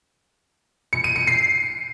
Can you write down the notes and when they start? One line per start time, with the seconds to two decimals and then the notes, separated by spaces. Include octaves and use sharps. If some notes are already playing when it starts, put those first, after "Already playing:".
0.93 C#7
1.04 D#7
1.16 C#7
1.27 C7